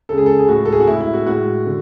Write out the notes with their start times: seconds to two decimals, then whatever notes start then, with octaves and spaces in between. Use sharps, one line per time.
0.09 C#3 G#3 A4
0.18 G#4
0.26 A4
0.39 G#4
0.48 A2 G#3 F#4
0.65 A4
0.72 G#4
0.80 F#4
0.87 A2 G#3 E4
1.01 E4
1.14 F#4
1.27 A2 G#3 F#4
1.66 D3